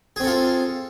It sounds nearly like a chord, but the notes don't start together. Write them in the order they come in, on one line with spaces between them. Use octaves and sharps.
G#4 C4 A4 F4